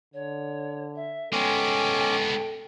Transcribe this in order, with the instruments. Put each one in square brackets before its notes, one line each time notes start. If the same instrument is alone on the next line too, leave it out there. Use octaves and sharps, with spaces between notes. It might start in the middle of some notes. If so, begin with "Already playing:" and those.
[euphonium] D3 [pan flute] C#5
[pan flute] E5
[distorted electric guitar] G#3 B3 [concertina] C#4 D6 [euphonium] A4 [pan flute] G5